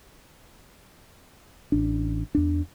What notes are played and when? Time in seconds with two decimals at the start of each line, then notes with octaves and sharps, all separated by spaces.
1.72 A1 D4
2.35 E2 D4